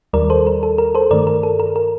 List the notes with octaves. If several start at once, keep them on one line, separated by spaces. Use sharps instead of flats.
D#2 D#3 G3 A#4 D5
A4 C5
A#4
A4
A#4
A4 C5
G2 D#3 A3 A#4 D5
A#4
A4
A#4
A#4